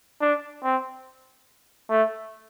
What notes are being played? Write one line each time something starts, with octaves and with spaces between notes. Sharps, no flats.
D4
C4
A3